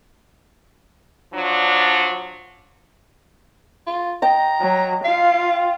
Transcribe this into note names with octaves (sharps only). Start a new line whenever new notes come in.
F3 F#3 D4
F4
D#5 G5 A#5
F#3
F4 F5